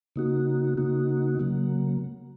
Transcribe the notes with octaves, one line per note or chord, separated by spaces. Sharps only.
C#3 A#3 D#4 F#4
C#3 A#3 D#4 F#4
C#3 F#3 A#3